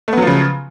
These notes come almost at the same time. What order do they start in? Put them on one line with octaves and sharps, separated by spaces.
A3 B3 F#3 F3 C#3